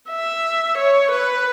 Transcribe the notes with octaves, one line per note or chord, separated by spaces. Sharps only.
E5
C#5
B4